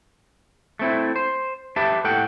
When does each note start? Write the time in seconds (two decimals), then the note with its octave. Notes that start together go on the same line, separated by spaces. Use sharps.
0.79 A3 C4 E4
1.16 C5
1.76 G4 B4 E5 A5
2.04 A2 A4 F#5 G5